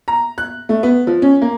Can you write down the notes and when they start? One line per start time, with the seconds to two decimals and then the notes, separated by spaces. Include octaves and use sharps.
0.08 A#5
0.38 F#6
0.69 A3
0.83 B3
1.07 F3
1.22 C#4
1.42 A#3